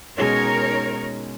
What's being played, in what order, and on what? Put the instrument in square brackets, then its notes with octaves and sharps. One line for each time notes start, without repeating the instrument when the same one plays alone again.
[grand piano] B2 G#3 C#4 [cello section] D#4 A#4 C#5